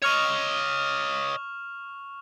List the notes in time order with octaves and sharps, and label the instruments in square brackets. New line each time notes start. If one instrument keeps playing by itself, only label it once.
[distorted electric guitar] C#5 D#5 [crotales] C#6 F6 F7